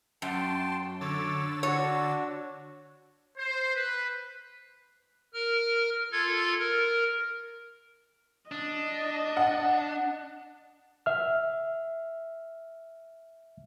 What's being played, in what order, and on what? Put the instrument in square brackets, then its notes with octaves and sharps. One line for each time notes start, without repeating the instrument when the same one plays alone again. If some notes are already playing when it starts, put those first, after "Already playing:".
[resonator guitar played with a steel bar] F#2 [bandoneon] G5 [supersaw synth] A5 C6
[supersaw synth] D3 E6 A6 [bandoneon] C#5 D6
[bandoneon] D4 F#4 [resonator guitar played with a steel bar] C#5
[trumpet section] C5
B4
[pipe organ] A#4 F6
F4 A4 G#6
A#4
[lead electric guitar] D4 [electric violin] D#5
[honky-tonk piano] F#5
[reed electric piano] E5 F6